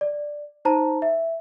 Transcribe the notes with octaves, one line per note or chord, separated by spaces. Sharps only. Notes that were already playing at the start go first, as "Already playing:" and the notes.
D5
D#4 C5 A5 A#5
E5